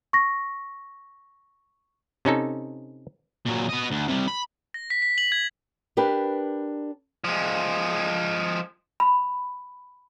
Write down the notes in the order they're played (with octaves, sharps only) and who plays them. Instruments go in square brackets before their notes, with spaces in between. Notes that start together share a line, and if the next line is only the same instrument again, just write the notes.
[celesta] C#6 A#6
[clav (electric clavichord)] C3 C#4 D#4 A4
[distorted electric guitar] A#2 F#3
B3 D#5
D2
C3 G3
B5
[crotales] A#6
B6
B6
F#7
G#6
[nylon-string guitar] D4 G4 A#4 B4
[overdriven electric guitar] F3 G#3
[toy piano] B5